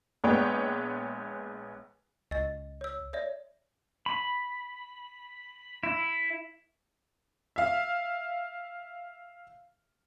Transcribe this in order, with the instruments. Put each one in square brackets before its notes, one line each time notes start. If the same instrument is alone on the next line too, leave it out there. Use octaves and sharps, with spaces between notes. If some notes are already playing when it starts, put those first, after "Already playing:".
[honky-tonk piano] A#1 G#3 B3 C#5 F#5 G5
[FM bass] C#2 [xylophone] D#5 A6
[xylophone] C#5 E6
C#5 D5 E5
[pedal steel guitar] B5
E4
[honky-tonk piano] E5 F5